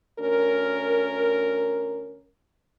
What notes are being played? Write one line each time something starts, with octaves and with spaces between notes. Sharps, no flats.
D2 C#4 A#4